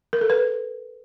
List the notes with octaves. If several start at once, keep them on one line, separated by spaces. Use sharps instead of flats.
A#4
A4
B4